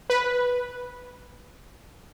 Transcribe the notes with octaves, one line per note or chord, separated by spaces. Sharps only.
B4